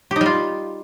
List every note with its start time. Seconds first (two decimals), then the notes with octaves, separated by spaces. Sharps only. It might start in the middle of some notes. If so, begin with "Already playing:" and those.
0.11 G4
0.16 D#4
0.21 G3
0.26 F4